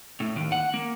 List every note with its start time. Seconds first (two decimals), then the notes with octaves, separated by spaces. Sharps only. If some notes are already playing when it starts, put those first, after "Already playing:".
0.20 A2
0.36 D#2
0.52 F#5
0.74 A#3